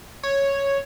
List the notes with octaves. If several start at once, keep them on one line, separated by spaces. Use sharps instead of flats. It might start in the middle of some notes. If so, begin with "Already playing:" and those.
C#5